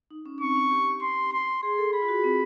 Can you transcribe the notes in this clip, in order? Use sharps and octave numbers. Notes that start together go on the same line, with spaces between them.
D#4
C#4
C4 C#6
D4
G4
C6
C6
G#4 C6
A4
G#4 B5
F4
F#4
C4